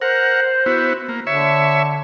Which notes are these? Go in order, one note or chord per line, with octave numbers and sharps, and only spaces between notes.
A#4 C5 F#5
B3 E4 F#4
A#3
D3 C#5 E5